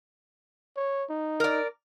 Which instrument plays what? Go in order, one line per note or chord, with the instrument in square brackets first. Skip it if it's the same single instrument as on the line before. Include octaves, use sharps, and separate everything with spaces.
[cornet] C#5
D#4
[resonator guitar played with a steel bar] A#4 D5